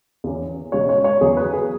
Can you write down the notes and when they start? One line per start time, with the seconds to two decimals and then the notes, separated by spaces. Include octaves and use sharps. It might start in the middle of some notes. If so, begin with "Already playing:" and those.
0.24 E2 E3 C#4
0.72 C#2 B2 G#3 C#4 C#5
0.89 C#5
1.04 C#5
1.21 E2 C#3 F#3 B3 G#4
1.37 B4
1.53 G#4